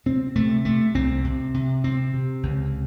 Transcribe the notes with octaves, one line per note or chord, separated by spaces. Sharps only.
C3 C4
C3 A3
C3 A3
C2 C4
C3
C3
C3 C4
C3
C#2